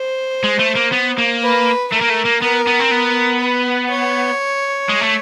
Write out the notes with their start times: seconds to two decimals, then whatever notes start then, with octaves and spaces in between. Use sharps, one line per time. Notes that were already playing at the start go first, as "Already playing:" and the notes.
Already playing: C5
0.44 G#3
0.60 A3
0.76 A#3
0.93 B3
1.18 A#3
1.43 B4
1.92 A3 A#4
2.01 A#3
2.09 A3
2.25 A#3
2.42 B3 A#4
2.67 B3
2.80 C4
2.91 B3
3.41 B4
3.90 C#5
4.89 G#3
5.01 A3